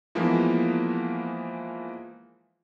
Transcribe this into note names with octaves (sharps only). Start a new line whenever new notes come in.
E3 F3 G#3 A#3 B3